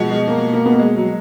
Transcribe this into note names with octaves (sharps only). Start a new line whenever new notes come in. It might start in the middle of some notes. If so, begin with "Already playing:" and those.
Already playing: B2 F3 G#3
G#3
A#3
A#3
B3
A#3
G#3
F#3